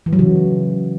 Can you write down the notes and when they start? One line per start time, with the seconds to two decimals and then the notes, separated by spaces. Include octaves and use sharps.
0.06 E3
0.13 F#3
0.19 C#3